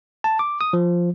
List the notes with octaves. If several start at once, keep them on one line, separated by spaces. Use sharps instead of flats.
A5
D6
D#6
F3